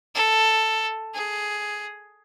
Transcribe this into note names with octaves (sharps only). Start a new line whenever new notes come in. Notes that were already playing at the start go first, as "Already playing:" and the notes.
A4
G#4